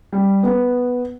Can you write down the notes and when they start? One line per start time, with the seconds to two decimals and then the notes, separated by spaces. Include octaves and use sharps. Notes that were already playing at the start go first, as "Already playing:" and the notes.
0.13 G3
0.43 B3